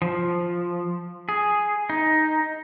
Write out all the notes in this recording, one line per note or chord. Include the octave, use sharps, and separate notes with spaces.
F3
G#4
D#4